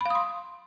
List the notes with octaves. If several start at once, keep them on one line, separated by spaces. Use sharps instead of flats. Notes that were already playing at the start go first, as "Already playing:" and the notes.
F5 B5 C6 D#6